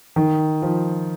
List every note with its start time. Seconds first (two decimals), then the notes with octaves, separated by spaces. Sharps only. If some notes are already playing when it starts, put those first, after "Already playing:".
0.16 D#3
0.62 F3